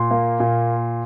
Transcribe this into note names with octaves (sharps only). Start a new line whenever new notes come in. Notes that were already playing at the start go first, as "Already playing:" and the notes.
Already playing: A#2 C6
A#3
A#2